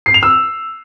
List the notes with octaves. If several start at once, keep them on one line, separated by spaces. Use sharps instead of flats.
C7
F7
E6